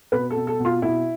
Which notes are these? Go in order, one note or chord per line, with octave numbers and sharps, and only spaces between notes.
B2 B4
A4
B2
A4
B2
F4
B2 E4